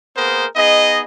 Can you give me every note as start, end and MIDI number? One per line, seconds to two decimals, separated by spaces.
0.16 0.46 58
0.16 0.46 59
0.16 0.46 68
0.16 0.46 70
0.16 0.46 72
0.56 1.03 59
0.56 1.03 63
0.56 1.03 68
0.56 1.03 75